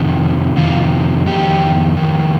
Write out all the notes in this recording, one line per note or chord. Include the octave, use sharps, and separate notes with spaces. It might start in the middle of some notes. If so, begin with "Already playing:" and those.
Already playing: F2 C3 D#3
F2 C3 D#3 F4
F2 D#3 G4
F2 D#3